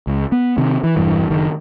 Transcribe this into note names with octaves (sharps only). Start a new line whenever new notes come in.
C#2
B3
C3 D#3
E3
E1 G2 E3
F#1 D#3